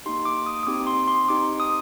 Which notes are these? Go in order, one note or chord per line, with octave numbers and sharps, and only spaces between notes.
A#3 D#4 G4 C6
D6
D#6
D#6
C4 D#4 G4 D6
C6
C6
C4 D#4 G4 D6
D#6